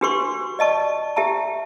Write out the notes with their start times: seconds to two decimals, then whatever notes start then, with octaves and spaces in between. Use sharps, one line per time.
0.01 D4 F#4 G4 B4 C6 C#6
0.59 D5 D#5 A5 C#6
1.16 G4 E5 A5 A#5